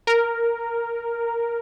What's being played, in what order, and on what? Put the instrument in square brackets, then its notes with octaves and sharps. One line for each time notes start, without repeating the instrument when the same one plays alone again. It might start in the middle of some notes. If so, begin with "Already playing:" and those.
[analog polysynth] A#4